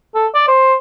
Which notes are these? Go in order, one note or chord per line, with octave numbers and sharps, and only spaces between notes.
A4
D5
C5